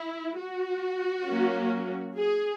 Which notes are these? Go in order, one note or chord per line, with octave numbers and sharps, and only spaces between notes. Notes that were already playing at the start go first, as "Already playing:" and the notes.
Already playing: E4
F#4
F#3 A#3 C#4
G#4